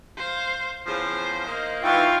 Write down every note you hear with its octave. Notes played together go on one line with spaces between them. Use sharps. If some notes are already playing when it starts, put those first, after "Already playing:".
C5 F5
E2 C#3 F3 C5
A#3 D#4
E3 D#4 F4 F5 G5 C#6